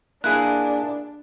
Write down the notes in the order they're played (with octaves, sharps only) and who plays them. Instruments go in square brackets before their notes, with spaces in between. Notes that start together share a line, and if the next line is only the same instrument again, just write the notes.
[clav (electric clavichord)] A#3 E4 G#4 [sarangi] D4 [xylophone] F#6